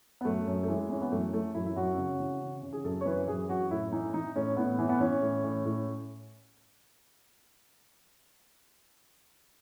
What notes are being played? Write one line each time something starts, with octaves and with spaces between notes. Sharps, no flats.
B3
F#2 A3
F#2
A3
E3 G#3
E3 C#4
B3
F#2 A3
E3 A3
F#2 E4
E4
F#2 F#4
C#3
E3
C#3
C#3
G#4
F#2 A4
C#5
E3 B4
F#2 G#4
F#2 F#4
A2 E4
E3 D#4
E3 D#4
A2 C#4
A2 B3
E3
B3
E3 C#4
A2
A2
A2